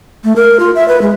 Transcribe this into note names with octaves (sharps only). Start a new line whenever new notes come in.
A3
A#4
F4
E5
B4
G#3